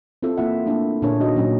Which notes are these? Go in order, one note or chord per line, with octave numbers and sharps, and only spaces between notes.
C4 E4 F4 A4
A#3 E4 F4 A4 E5 F#5
A3 A#3 D4 E4
A#2 D4 E4 G#4 A#4 C#5
D#4 F#4 D#5
A#2 F#3 C#4